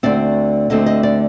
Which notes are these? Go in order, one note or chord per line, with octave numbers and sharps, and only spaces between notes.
D2 D3 A3 C4 D5
D2 D3 A3 C4 D#5
D#5
D5